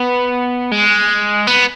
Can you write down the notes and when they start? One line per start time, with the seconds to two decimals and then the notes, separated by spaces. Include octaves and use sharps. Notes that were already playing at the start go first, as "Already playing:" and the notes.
Already playing: B3
0.72 G#3
1.47 B3